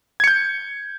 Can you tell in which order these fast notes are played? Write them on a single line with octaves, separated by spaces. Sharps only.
G#6 C#7 G6